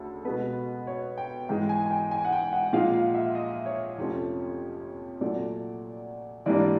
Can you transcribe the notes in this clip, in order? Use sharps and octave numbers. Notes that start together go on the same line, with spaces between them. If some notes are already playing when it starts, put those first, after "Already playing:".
Already playing: D2 C#3 A4
B2 G#3 B3 B4
C#5
G5
G#2 E3 G#3 G5
G#5
G#5
G5
G#5
F#5
G5
F#5
A#2 F3 G#3 F5
F5
E5
D#5
C#5
F2 C3 F3 A3 C#4
A#2 F#3 A3 D5
G#2 E3 G3 A#3 D4 D5